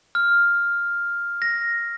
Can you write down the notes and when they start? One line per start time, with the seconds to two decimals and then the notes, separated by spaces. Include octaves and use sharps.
0.15 F6
1.42 A#6